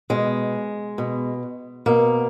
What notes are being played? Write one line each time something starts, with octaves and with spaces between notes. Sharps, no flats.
B2 G#3
B2
B2 A#3